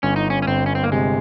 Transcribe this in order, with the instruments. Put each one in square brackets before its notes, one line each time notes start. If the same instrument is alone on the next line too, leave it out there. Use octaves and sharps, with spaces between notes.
[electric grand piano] G1 [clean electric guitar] C#4
[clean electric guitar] D#4
C#4
C#4
[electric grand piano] G1 [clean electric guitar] C4
[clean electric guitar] C#4
C4
A#3
[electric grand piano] C3 [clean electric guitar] G#3